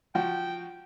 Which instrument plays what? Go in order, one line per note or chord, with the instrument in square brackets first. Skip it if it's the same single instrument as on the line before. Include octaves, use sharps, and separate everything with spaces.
[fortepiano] F3 F#4 [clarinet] G5